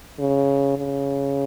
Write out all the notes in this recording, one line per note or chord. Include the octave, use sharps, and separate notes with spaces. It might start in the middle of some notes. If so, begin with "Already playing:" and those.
C#3
C#3